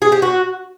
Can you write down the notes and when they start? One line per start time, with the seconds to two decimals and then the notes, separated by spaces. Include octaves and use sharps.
0.02 G#4
0.12 G4
0.22 F#4